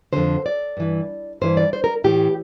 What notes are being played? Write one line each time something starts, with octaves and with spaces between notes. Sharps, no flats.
F2 D3 C5
D5
G2 E3
G2 E3 C5
D5
C5
A#4
A2 E3 G4